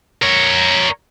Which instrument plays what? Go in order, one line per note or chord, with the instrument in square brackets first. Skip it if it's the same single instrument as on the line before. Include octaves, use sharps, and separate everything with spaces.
[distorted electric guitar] A#4 C#5